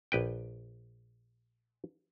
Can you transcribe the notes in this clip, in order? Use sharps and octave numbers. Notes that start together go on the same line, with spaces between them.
A#1 B4 G5